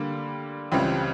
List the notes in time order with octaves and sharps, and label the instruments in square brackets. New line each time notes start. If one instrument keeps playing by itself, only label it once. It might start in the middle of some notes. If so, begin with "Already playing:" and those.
Already playing: [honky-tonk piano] D3 G3 A#3
C#2 C#3 E3 G3 C4